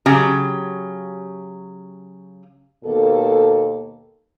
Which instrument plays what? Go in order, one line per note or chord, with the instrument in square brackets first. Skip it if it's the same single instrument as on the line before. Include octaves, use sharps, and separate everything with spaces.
[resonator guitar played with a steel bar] C#3 F#3 G4
[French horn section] D#2 B2 A#3 A4